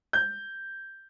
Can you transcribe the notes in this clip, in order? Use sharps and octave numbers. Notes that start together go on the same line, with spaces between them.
G6